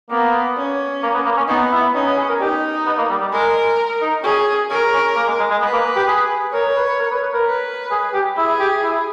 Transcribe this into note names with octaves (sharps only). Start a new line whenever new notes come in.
A#3 B3
C#4
A#3
B3
A#3
C#4
B3 D#4
E4
C#4 D#4
B3
G#4
A#4
D#4 G4
B3
A#3
G3
G3
G#3 A#4
D#4
C#4 G#4
C#4 A#4
C#4
A#3
G#3
G#3
G#3
B3 B4
A#3
G4
G#4
A#4 C#5
B4
A#4
B4
B4
A#4
B4
G#4
G4
E4 G#4
G4
E4